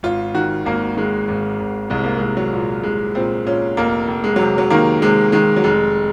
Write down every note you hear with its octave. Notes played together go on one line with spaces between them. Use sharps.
G#1 F4
D#3 F#4
G#1 A#3
D#3 G#3
G#1
G#1
C2 G#3
A#3
G#3
C2
F#3
A#2
C2 G#3
A#2 C4
A#2 C#4
F1 A#3
F1
G#3
C3 F#3
F#3
D#3 A#3
C3 G#3
D#3 G#3
F#3
F1 G#3